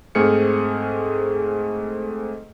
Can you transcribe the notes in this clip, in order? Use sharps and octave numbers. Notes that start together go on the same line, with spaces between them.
G#2 A3 C4 G#4 F6 C#7